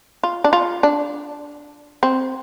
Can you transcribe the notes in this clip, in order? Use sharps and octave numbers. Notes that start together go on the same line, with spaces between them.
F4
D4
F4
D4
C4